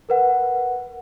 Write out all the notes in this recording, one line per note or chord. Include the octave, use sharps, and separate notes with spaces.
A#4 B4 F#5